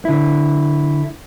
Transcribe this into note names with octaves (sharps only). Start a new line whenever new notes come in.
D3 E4